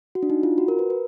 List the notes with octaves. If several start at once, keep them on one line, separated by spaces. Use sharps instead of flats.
F#4
D4
D#4
F4
F#4
A#4
B4
B4